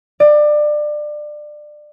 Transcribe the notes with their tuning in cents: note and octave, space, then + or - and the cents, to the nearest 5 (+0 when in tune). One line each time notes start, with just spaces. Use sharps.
D5 +25